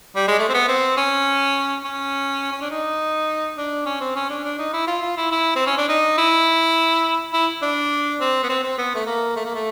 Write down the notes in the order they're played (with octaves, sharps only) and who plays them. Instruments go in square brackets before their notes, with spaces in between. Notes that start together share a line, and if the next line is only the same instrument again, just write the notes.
[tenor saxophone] G3
G#3
A3
C4
B3
C4
C#4
C#4
C#4
D4
D#4
D4
C#4
C4
C#4
D4
D4
D#4
E4
F4
F4
E4
E4
C4
C#4
D4
D#4
E4
E4
D4
C4
B3
C4
C4
B3
A3
A#3
A3
A#3
A3